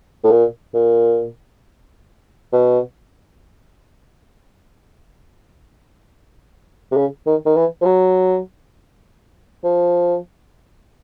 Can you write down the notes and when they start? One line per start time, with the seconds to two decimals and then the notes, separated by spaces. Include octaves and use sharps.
0.24 A2
0.31 A#2
0.74 A#2
2.53 B2
6.92 C3
6.97 C#3
7.27 D#3
7.46 D#3
7.56 E3
7.81 F3
7.85 F#3
9.64 F3